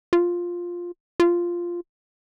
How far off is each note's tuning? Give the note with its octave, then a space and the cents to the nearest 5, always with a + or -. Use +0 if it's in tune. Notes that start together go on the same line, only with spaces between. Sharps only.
F4 +5
F4 -5